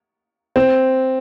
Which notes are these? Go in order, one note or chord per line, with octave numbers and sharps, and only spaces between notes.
C4